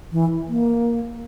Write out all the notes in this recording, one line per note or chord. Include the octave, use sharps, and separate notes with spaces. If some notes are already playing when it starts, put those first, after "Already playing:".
E3
A#3